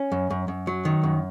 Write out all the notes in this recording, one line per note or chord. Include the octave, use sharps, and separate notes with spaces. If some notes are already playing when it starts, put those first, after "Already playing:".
Already playing: C#4
F#2
F#2
F#2
F#3
D#3
F#2